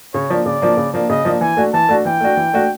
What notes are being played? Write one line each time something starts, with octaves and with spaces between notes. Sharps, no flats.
C#3 C#5
F3 A#3 D4
C#3 D5
F3 A#3 D4
C#3
F3 A#3 D4
C#3 D#5
F3 A#3 D4
E3 G#5
A3 D4 F#4
E3 A5
A3 D4 F#4
E3 G5
A3 D4 F#4
E3
A3 D4 F#4